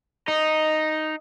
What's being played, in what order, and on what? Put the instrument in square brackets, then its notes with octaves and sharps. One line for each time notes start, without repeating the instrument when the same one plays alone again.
[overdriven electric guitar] D#4 [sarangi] D#5